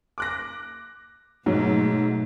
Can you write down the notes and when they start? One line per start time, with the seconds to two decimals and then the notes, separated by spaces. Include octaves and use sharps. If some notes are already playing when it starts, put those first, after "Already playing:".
0.18 D6 F#6 A#6
1.46 G#2 B2 F#3 A3